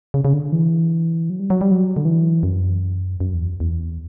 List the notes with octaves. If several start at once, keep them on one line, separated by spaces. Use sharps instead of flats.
C#3
C#3
D3
E3
F#3
G3
F#3
G3
F#3
D3
E3
F#2
F#2
E2
E2